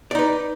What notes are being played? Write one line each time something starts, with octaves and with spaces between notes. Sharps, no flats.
D#4 B4 D5